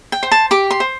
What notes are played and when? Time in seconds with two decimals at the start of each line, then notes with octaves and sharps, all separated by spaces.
0.12 G5
0.23 C5
0.32 A5
0.51 G4 D6
0.71 C6
0.80 C5